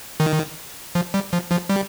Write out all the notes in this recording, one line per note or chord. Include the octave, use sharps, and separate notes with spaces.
D#3
F3
G3
F3
F3
G3